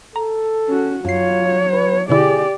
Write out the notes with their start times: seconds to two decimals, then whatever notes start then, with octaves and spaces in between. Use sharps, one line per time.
0.16 A4 A#5
0.68 C#4 F#4
1.05 F#2 F#3 F4 C#5 C7
1.72 B4
2.09 B2 D3 E4 G4 G#4 D5